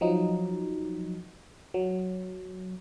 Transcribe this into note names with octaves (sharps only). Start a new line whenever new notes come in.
F3 F#3 D#4
F#3